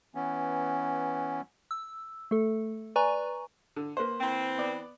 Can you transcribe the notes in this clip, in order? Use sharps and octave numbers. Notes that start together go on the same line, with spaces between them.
E3 B3 C#4
E6
A3 A4
B4 D5 G#5 A#5 C#6
D3
A#3 B4 C5
E3 C4
B3 D5